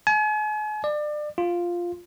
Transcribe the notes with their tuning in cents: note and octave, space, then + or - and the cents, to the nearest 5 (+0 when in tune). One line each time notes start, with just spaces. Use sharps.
G#5 +40
D5 +30
F4 +0